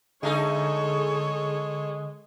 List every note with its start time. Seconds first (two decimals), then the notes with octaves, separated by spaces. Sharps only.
0.23 D3 G#3 A3 D#4 G#4 A4 C#5